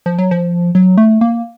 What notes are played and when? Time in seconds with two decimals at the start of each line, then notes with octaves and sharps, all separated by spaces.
0.06 F3
0.19 F#3
0.31 F3
0.75 F#3
0.98 A3
1.21 A#3